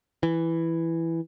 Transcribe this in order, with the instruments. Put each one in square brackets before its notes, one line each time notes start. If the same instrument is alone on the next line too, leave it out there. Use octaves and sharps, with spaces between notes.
[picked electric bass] E3